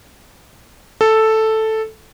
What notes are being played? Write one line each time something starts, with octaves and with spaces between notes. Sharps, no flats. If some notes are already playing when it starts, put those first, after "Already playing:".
A4